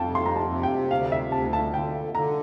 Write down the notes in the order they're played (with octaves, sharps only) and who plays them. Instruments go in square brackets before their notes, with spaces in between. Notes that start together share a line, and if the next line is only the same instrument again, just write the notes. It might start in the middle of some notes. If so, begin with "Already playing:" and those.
Already playing: [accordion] F2 [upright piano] F5 G5 A5
[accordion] C3
[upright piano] C6
A#5
A5
[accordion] C3
[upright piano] G5
[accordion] D2 [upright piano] F5
[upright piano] E5
[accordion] D2 [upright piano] A5
[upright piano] A5
[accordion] D3 [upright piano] G5
[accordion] D3 [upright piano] A#5